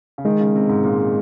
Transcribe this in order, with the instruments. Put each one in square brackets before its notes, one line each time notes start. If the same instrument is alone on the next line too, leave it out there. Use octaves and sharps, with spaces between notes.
[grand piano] C#3
[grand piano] D#3 [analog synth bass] G#3
[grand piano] C#3
C3
G#2
A#2